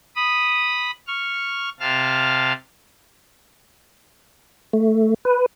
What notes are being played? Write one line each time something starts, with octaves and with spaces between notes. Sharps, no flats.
B5 D#6
C#6 F6
C3 F5 A5 F6
A3
B4